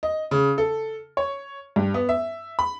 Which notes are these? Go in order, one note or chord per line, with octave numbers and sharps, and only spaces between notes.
D#5
C#3
A4
C#5
G2
B3
E5
B5